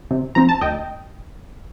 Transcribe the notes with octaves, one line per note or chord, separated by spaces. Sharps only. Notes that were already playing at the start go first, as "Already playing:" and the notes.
C3
F3 C4 A#5
A5
D2 D#5 G5